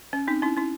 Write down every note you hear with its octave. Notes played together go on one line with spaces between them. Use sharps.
C#4
C4 D#4
C#4 E4
C#4 E4